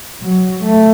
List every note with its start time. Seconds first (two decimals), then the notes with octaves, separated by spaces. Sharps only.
0.22 F#3
0.63 A3